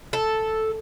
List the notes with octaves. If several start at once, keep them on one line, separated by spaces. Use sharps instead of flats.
A4